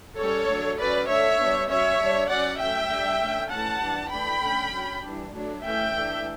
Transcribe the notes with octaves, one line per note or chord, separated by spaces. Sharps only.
G3 C#4 A4 C#5
F#3 A3 D4
F#3 C#4 B4 D5
D3 A3 D4 C#5 E5
G3 B3 D4
F#3 C#4 C#5 E5
G3 D4
F#3 C#4 D5 F#5
F#3 A3 C#4 E5 G5
G3 D4
D3 A3 C#4
E3 A3 C#4 F#5 A5
E3 G3 D4
E3 A3 D4 G5 B5
D3 A3 C#4
F#3 C#4
E3 G3 D4
F#3 A3 D4
E3 A3 C#4 E5 G5
E3 A3 D4